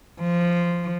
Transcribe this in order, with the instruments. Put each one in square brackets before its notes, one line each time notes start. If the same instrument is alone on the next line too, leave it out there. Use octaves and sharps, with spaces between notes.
[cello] F3